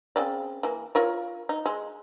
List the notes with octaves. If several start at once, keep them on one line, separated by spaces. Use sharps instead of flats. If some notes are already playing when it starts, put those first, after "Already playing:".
C#3 C4 D5
E3 A#3
F4 A#4 C#5
D#4
G#3